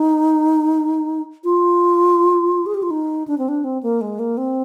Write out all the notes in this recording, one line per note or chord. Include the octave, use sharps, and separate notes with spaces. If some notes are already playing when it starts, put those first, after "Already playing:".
Already playing: D#4
F4
G#4
G4
F4
D#4
D4
C4
D4
C4
A#3
G#3
A#3
C4